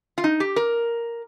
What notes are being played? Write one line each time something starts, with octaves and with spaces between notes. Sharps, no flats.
F4
D#4
G4
A#4